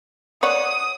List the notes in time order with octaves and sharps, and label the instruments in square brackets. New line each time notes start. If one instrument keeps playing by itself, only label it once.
[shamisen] C#5 D5 F#5 [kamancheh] D#6